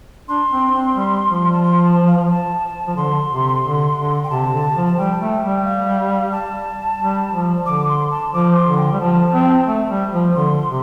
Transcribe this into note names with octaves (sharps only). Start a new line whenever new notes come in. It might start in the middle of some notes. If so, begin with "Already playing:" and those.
D4 C6
C4
C4
G3
F3
A5
C6
A5
F5
A5
F3
D3 C6
C3
D3
D3
G5
C3 A5
D3
F3
A5
G3 G5
A3
G3
F5
A5
G3
F3
D3 D6
C6
A5
F3 D6
C6
D3
G5
G3
F3 A5
C4
A3
G3
F3
D3 C6
C3